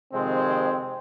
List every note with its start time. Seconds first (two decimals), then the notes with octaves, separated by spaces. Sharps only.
0.13 F2 C3 D#3 G#3 C4